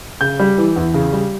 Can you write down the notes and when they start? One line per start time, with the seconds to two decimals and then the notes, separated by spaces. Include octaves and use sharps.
0.21 C#3 G6
0.40 G3
0.58 E3
0.76 E2
0.94 C#3
1.13 G3